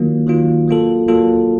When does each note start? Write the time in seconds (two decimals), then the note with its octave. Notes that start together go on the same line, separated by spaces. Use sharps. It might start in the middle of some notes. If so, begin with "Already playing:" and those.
Already playing: D#3 F#3 A#3 F4
0.27 D#3 F#3 A#3 F4
0.67 F#3 A#3 F4 A4
1.08 F#3 A#3 F4 A4